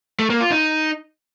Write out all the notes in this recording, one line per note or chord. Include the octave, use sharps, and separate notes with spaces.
A3
A#3
F4
D#4